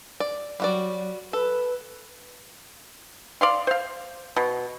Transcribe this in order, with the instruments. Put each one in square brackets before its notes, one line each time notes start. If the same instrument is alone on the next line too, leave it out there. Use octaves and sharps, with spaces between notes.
[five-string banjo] D5
[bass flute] F#3 [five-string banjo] G3 F#4 D5
[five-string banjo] A4 [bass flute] B4
[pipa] D5 F5 C6
C5 F5
B2